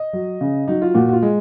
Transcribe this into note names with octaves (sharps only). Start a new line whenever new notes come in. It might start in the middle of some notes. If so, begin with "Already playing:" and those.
Already playing: D#5
F#3
C#3
F#3 D#4
F4
A#2 F#4
F#4
F4
G#3